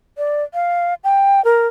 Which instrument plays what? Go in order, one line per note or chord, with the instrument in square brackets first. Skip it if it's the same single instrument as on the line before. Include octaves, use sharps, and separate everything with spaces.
[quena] D5
F5
G5
A#4